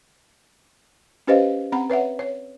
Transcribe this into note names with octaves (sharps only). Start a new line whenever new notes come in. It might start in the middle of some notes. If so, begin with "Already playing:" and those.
C#4 G4 B4 C5 D#5 F5
C4 F#5 A#5 B5
B4 C#5 E5 F#5
C#5